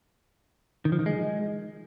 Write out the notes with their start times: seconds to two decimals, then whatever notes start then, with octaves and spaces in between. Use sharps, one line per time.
0.85 D#3
0.92 F3
0.99 D#3
1.06 G#3